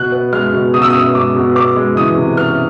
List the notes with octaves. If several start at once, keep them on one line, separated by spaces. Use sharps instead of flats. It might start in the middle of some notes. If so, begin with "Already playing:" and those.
Already playing: B2 F#6
B3
G#3 F6
B2
B2 D#6
E6
B3 D#6
G#3 D6
B2
B3 D6
G#3
E3 D#6
C3
B3 F6